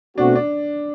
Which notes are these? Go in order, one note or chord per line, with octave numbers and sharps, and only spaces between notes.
B2 A3 C4 D4 F#4
D4